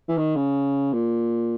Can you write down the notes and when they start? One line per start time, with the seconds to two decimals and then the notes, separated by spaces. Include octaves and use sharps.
0.08 E3
0.18 D#3
0.36 C#3
0.93 A#2